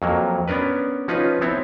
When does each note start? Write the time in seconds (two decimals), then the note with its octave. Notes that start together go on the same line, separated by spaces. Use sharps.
0.02 F2 F#3 A#3
0.48 B3 C#4 D4 A#4 B4
1.08 F3 C#4 D#4 F4 B4
1.41 B3 C4 E4 C#5